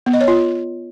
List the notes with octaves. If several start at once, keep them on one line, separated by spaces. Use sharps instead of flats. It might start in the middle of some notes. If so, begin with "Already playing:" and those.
B3
D#5
C#5
F4